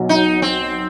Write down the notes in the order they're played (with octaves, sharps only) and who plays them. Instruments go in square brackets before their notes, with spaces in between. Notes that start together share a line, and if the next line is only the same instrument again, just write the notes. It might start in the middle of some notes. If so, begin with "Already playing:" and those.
Already playing: [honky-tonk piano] B1 F#3
[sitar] D#4
C4